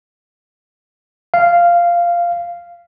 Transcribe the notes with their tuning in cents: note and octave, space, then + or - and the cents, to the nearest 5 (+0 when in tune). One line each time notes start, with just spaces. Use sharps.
F5 -10